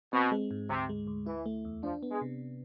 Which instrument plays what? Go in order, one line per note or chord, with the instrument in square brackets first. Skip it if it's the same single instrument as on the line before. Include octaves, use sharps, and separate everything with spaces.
[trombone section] B2 [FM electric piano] C4
[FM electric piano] G#3
G#2
[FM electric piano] D2 [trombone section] C3
[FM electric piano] G#3
D2
[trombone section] E3 [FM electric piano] E4
[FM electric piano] A3
E2
[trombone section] F3 [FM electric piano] D4
[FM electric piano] B3
[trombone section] G#3
[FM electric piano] C3